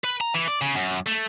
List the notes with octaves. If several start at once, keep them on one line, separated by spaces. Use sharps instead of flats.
B4
A#5
E3
D5
C#3
F#2
A3